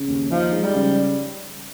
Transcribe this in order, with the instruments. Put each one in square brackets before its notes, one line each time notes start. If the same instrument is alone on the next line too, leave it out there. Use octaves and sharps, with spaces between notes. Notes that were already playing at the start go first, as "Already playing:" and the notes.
Already playing: [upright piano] C#3
D#2
[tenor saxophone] F3 [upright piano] D#4
[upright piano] G#3
[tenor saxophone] G3
[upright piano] C#3